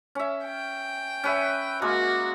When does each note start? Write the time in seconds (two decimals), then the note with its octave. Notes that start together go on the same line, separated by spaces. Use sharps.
0.15 C#4 E5
0.45 G5
1.24 C#4 B4 E5
1.82 G#3 A#3 F#4 A#4